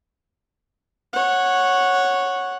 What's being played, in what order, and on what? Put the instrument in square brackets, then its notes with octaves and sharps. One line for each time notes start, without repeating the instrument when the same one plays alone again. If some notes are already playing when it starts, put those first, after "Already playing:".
[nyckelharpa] C#5 F#5